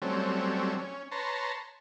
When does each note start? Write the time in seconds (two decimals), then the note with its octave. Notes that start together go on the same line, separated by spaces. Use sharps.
0.02 F#3 G3 A3 C4 C#4
0.79 C#4
1.12 B4 C#5 A5 A#5 C6